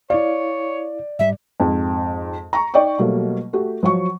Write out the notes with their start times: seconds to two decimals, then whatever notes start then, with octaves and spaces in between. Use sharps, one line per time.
0.10 E4 C#5 D5 F5
1.19 G#2 G3 E5
1.60 F2 G#2
2.53 A#5 C#6
2.74 D#4 D5 D#5 G5 C#6
2.98 B2 F#3 G3 A3 A#3
3.53 A3 F#4 G4
3.83 F3 F#3 C#6